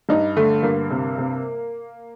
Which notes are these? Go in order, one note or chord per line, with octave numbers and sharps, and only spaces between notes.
G2 D#4
D3 A3
G2 A#3
C3
C3